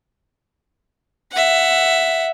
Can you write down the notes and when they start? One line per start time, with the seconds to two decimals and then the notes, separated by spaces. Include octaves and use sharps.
1.32 E5 F#5